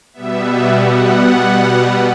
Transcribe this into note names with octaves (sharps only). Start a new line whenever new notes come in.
B2 G3 B3 E5
E5
F#5